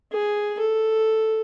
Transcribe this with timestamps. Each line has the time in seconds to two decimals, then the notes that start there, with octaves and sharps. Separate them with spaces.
0.12 G#4
0.59 A4